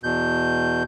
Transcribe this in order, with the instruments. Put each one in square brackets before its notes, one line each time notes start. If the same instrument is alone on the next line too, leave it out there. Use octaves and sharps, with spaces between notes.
[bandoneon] E2 B2 G6